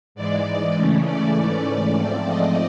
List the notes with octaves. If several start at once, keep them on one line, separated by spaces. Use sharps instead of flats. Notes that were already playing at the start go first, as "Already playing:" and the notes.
G#2 E3 G#3 D5
C#3 E3 A3 C#4
D5
G#2 E3 A3 C#4
G#2 F3 A3 C4
D#5